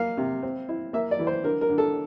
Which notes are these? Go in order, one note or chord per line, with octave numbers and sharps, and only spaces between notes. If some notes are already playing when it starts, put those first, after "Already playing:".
Already playing: A#3 F5
C3
C4
E4
A#3 E5
D5
E3
C5
D3 A#4
A#4
D3
A4